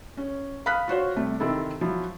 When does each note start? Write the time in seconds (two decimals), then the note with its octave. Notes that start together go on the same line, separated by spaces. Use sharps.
0.17 C#4
0.66 F5 B5 D#6 F6 F#6 B6
0.88 F4 F#4 C5 C#5
1.16 C3 G3 A3
1.40 C3 D#3 C4 E4 A4
1.81 F3 F#3 E4